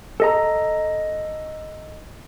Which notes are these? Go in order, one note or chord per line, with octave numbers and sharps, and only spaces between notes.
A4 D#5 A#5